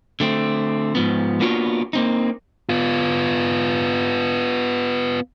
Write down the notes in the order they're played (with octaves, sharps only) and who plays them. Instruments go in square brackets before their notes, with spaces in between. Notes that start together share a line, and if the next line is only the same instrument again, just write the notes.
[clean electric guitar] D3 A3 C4
G#2 F3 B3
A#3 B3 D4 F4 F#4 C#5
A#3 C4 D#4
[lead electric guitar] B3 F4